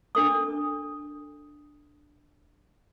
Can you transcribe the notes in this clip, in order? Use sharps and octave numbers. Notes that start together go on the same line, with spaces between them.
D4 A4 D#6